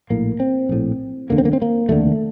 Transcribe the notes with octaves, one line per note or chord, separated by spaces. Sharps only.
A#1 A2 A#3
C4
A#1 A2
F1 D#2 D3 A#3
C4
A#3
C4
A#3
F1 D#2 D3 A3